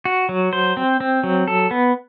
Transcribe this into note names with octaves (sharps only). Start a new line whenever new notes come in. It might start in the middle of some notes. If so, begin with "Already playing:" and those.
F#4
F#3
C5
C4
C4
F#3
A4
B3